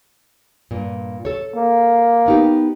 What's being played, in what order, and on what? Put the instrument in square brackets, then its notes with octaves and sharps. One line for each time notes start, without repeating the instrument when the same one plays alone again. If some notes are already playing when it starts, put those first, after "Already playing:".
[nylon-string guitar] G2 A#2
A4 C#5
[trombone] A#3
[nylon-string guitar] B3 D#4 G4